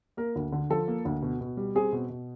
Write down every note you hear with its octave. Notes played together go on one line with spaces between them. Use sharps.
A#3 A#4
D2
D3
F3 A4
A#3
D2
B2
B2
G3
C4 G#4
B2
B2